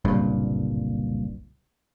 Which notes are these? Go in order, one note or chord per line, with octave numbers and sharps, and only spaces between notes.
F#1 C2 G2 A#2